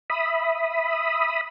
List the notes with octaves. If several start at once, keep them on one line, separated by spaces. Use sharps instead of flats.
E5 B5 D#6